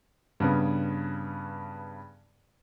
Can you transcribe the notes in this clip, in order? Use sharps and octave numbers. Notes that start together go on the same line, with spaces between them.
G2 C#3 B3